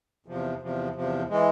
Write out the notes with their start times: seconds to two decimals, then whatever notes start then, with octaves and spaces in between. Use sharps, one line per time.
0.26 E2 C3 F3
0.62 E2 C3 F3
0.95 E2 C3 F3
1.29 E3 G#3